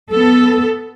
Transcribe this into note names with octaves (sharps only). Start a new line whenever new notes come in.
B3 A4